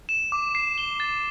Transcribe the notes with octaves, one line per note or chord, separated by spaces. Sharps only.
E7
D6
C7
G7
A6